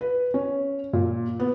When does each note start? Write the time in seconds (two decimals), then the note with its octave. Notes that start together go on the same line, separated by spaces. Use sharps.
0.01 B4
0.34 C#4
0.93 A#2
1.40 B3